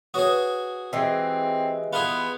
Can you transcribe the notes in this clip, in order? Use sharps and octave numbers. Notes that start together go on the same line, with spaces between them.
F#4 G#4 B4 C#5 D#6
E3 G#3 C4 G4
B3 F4 G#4